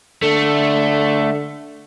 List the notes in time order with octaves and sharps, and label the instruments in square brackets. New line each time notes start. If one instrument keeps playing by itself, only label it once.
[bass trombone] D3 [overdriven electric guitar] A3